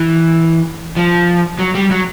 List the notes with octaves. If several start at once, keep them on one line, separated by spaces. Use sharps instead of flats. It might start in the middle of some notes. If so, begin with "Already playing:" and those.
Already playing: E3
F3
F#3
G3
F#3